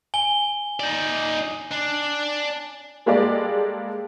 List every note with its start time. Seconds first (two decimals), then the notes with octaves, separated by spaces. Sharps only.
0.14 G#5 G7
0.80 D#4 D5
1.71 D4
3.06 G3 G#3 A#3 G4 A4 D5